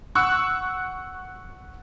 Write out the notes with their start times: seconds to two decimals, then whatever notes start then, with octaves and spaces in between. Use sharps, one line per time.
0.15 F#5 C#6 E6 F#6